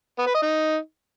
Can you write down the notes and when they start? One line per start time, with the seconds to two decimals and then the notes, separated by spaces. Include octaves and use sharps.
0.19 B3
0.26 B4
0.34 D#5
0.42 D#4